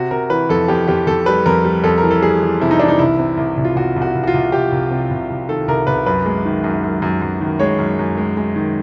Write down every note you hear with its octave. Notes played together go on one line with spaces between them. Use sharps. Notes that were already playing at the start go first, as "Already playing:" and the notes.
Already playing: C3 F#4
C3 A#4
E3 B4
F2 A4
F2 G4
F2 G4
F2 A4
G3 B4
F2 A#4
G3
F2 A4
A#4
E3
A4
G3 G#4
E3
C3 E4
D#4
E3 D4
D#4
C2 E4
C3
C2
C2
F4
C2 F#4
C2
F#4
C2
F#4
F4
C2
C2 G4
C2
C3
C2
C2
D#3 A4
C2 A#4
C2 B4
F#2 B4
G#3
D#3
F#2
F#2
F#2
F#2
D#3
G#3 C#5
F#2
F#2
G#3
G#3
D#3